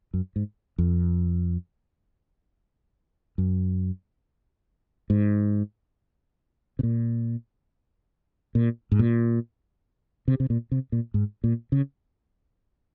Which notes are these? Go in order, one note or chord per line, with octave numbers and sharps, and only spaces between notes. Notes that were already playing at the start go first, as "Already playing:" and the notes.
F#2
G#2
F2
F#2
G#2
C3
A#2
A#2
G#2
A#2
C3
C3
A#2
C3
A#2
G#2
A#2
C#3